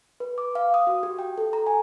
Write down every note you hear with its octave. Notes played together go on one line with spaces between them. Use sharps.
B4
D6
F5
D#6
F#4
G4
G5
A4
A#5
G#5